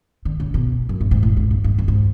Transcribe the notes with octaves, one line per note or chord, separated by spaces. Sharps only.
D3
C#3
B2
F#2
G2
G#2
A2
G#2
G2
G2
G2
G#2